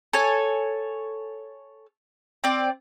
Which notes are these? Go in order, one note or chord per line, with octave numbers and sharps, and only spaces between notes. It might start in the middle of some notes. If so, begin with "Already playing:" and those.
A4 C#5 G#5
C4 D5